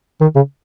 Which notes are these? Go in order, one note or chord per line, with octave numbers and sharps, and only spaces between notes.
D#3
C#3